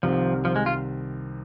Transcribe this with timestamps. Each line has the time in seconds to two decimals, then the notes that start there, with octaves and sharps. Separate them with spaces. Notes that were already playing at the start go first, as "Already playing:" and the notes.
0.03 C2 C3 D#3 F3 C4
0.45 F3
0.56 G#3
0.66 F4